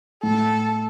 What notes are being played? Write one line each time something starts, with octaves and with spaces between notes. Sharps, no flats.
A2 A4